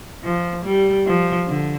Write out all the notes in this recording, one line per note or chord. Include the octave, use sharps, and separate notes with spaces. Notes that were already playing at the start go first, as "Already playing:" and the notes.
F3
G3
F3
D3